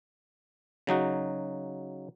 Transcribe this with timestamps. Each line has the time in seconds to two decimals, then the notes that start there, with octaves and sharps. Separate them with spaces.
0.87 C#3 F#3 D#4 F#4